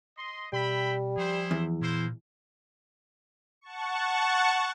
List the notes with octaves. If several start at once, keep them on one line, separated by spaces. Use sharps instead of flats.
D#5 C6
B2 G3 E5 G5 B5
F3 E4 G#4 C5
E2
A#2 A#3 E4 C5
F#5 A5 C#6